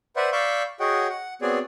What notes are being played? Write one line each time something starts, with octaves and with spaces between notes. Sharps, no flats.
B4 C5 D5 E5 F#5
D5 F5 B5 C#6 E6 G6
F#4 G#4 C#5 D#5 F#5 G5
F#5
B3 C4 F#4 G#4 C#5 D5